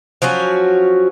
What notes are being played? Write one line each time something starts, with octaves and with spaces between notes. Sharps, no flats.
F3 F#3 C#4 F#4